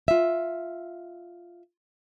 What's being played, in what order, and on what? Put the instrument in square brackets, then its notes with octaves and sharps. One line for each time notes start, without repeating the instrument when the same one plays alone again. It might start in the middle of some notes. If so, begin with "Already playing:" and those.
[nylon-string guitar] F4 E5